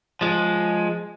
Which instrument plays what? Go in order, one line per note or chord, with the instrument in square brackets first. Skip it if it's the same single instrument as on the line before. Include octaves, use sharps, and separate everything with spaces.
[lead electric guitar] F3 G#3